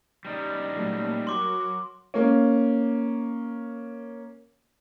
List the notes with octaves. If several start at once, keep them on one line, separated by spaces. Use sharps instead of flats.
G3 D#4
A#2 F#3 A3
F#3 F#4 A#4 C6 D6
A#3 C#4